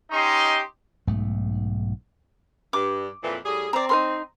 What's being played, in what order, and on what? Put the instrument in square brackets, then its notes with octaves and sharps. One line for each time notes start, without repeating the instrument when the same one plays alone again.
[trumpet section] C#4 D#4 G4 D#5 C6
[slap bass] B1 G#2 A3
[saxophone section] G2 [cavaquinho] D6
[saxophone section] F2 A#2 E3
A2 G3 G#4
[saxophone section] C4 [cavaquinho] D5 A#5
[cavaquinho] D#4 A#4 C6